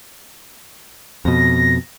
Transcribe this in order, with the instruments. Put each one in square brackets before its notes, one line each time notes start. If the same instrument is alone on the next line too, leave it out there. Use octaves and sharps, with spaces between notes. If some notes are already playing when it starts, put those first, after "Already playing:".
[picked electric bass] F2 B2 [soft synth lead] A#6